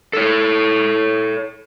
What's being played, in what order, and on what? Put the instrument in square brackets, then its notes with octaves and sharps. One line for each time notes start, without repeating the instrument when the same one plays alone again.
[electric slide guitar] A4 C#5